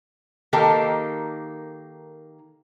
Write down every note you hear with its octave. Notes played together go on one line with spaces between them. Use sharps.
D#3 A#3 D#4 G4 A4 A#4